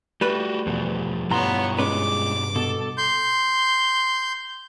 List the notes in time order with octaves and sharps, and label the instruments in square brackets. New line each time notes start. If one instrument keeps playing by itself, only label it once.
[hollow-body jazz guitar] G3 A3 B4 [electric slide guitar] F#4 G4
[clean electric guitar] E2 [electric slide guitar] B2 F3
[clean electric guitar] G2 A#5 C6 [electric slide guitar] B2 E4 F4 [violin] B3 C#5
[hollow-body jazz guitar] G#3 C#4 B4 [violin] D6
[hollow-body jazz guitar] B2 [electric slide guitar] A4
[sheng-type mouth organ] C6 G6